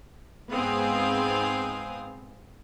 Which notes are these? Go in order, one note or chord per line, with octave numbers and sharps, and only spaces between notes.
G#2 B3 C4 G#4 F5 D#6